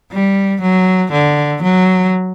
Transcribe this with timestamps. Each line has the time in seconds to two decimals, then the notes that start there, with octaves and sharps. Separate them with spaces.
0.12 G3
0.62 F#3
1.12 D3
1.62 F#3